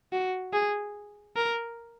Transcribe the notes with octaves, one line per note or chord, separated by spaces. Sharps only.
F#4
G#4
A#4